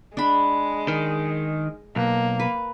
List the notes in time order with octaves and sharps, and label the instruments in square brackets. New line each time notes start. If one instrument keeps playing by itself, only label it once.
[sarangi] G#3 [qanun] D4 B5
[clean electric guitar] D#3
[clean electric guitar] B1 [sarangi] A#3
[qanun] B4